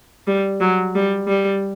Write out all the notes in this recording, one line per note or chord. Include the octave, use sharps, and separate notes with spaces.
G3
F#3
G3
G3